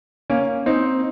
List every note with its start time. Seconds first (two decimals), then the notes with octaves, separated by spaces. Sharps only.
0.30 A#3 C#4
0.66 C4 D#4